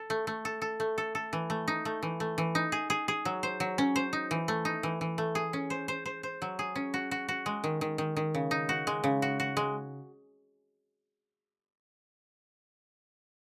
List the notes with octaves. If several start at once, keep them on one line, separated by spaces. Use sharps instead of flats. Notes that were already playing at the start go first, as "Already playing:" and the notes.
Already playing: A4
A3
A3
A4
A4
A3
A4
A4
E3
A3
D#4
A3
E3
A3
E3
D#4
G#4
G#4
G#4
F#3
C5
F#3
C#4
C5
D#4
E3
A3
D#4
E3
E3
A3
G#4
C#4
C5
C5
C5
C5
F#3
G#4
C#4
F#4
F#4
F#4
G#3
D#3
D#3
D#3
D#3
C#3
D#4
F#4
G#3
C#3
F#4
F#4
G#3